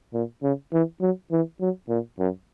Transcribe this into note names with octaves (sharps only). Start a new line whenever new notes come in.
A#2
C#3
E3
F#3
E3
F#3
A#2
F#2